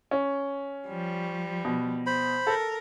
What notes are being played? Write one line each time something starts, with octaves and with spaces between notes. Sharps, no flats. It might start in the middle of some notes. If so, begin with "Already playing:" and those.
C#4
F3 G3
B2
C5 B5
A4 A#4